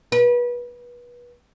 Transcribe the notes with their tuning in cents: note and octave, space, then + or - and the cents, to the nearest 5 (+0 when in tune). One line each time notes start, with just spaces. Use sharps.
B4 -30